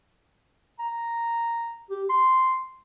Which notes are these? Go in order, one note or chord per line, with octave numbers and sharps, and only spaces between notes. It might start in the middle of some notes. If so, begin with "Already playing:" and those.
A#5
G4
C6